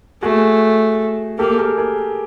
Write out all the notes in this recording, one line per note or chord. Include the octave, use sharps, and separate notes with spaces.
A3 F#4 G#4
A#3 G4 A4
G#4 A#4
G#4 A#4